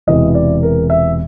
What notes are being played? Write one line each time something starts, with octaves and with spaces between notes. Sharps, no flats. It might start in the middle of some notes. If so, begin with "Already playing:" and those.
E1 E2 C3 E3 D#5
D5
A#4
E5